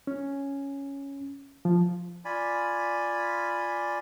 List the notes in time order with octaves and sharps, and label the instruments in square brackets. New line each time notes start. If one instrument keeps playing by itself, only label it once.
[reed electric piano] C#4
F3
[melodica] F4 D5 G#5 B5